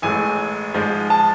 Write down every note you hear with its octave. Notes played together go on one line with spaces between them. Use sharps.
A1 A2 G#3 G#5
G#2 F3 G#3
A5